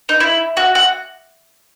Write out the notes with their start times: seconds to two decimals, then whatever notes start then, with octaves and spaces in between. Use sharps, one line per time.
0.09 D#4
0.20 E4
0.57 F#4
0.75 F#4